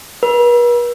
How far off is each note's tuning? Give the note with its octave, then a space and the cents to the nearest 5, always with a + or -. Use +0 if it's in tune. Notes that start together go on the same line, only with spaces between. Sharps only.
B4 -45